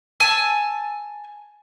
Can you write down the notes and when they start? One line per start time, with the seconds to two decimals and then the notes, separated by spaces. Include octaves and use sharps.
0.20 G#5 A5 E6